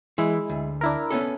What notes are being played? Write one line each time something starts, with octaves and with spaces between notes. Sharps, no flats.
E3 G#3 E4
D2
D4 E4 A#4
B3 C#4 A4